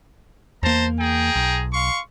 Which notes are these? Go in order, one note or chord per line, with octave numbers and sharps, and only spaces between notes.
E2 A#3 C5 A5 A#5
G#4 G5 A#5
B1
F5 C6 C#6